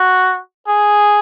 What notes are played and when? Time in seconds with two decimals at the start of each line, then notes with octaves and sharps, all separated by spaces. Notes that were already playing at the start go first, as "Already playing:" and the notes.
Already playing: F#4
0.68 G#4